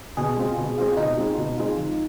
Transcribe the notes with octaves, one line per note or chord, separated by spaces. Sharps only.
B2 G#4
G#3 C4 F4
B2
G#3 C4 F4
B2 D#4
G#3 C4 F4
B2
G#3 C4 F4
F3